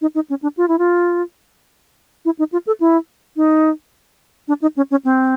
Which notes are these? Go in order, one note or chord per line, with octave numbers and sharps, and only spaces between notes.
D#4
D#4
C#4
D4
F4
E4
F4
E4
D#4
F4
A4
E4
D#4
D4
D#4
C#4
C#4
C4